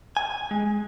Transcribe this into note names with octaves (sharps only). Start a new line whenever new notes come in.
G#5
G#3